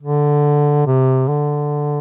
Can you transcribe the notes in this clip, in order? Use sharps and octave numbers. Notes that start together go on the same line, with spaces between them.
D3
C3
D3